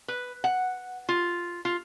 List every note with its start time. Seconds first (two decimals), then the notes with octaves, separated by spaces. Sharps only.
0.08 B4
0.44 F#5
1.09 F4
1.65 F4